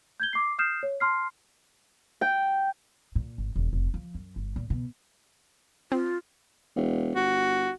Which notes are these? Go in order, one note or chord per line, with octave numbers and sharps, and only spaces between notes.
G6 G#6 G7
D6 C7
D#6 F6 G6 C7 E7
C#5
A5 C6 F6 C7
G5
A#2
G#1
E1
F1
F3
F#2
G1
A#2
B2
C4 F4
E1
G1 F#4